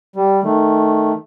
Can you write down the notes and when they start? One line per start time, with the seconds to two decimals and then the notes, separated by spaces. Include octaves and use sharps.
0.16 G3
0.44 D#3 A3